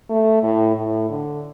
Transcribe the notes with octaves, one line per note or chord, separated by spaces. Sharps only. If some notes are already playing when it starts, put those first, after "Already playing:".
A3
A2
A2
D3